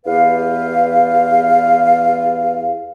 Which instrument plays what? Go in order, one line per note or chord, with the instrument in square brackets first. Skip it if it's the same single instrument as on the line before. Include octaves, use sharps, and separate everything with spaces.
[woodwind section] E2 G4 B4 F5